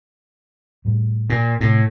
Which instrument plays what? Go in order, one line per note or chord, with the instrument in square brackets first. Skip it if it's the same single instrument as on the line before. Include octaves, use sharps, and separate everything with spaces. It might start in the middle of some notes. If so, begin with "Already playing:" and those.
[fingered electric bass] A2 G3
[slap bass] A#2
[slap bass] A2 [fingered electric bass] C3